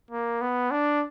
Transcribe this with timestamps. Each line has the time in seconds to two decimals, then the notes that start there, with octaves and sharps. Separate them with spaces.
0.11 A#3
0.41 B3
0.71 D4